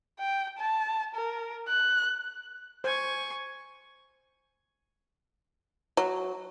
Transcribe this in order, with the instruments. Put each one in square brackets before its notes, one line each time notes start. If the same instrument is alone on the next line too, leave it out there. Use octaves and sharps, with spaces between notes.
[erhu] G5
A5
A#4
F#6
[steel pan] C5 [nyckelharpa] G#5 C#6
[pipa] F#3